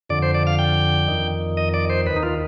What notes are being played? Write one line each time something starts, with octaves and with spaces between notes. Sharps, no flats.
F2 D3 D5
C5
D5
F5
G5
F2 D#3
D#5
D5
C5
D#2 D#3 B4
D#4
F4